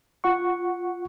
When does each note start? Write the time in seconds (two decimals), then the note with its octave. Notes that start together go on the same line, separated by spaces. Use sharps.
0.24 F4 F#5 C#6